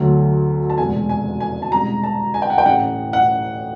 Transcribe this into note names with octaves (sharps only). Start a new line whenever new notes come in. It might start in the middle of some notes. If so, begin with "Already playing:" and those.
Already playing: D2 D3 F#3 A3
A5
F1 E2 B2 G#3 G#5
G#5
G#5
A5
C2 B2 G#3 A#5
A5
G#5
G5
F#5
G5
A1 A2 E3 F#5
F#5